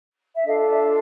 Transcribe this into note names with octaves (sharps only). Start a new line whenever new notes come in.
E5
D4 F4 A4 D#5 F5
D5 E5